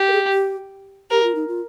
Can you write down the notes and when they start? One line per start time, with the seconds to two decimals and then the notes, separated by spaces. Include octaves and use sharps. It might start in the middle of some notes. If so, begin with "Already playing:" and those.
Already playing: G4
0.08 A#4
0.13 G#4
0.33 G4
1.11 G4 A#4
1.24 F4
1.35 D#4
1.48 F4